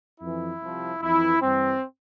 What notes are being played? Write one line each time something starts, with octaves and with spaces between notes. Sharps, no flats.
F2 E3 E4
C2 C3 F3
F2 E3 E4
G2 E3 C4